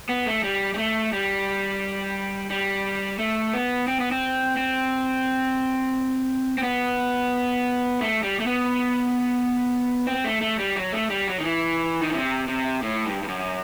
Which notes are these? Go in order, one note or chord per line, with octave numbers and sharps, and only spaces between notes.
B3
A3
G3
G3
A3
G3
G3
A3
B3
C4
B3
C4
C4
C4
B3
A3
G3
A3
B3
C4
A3
A3
G3
F#3
A3
G3
F#3
D#3
E3
D#3
C3
C3
A2
G2
G2
F#2